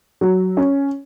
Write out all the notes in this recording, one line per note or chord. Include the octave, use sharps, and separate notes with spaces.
F#3
C#4